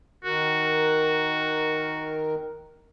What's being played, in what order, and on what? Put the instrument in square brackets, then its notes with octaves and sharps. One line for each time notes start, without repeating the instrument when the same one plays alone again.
[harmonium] D#3 A#4 [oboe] F#4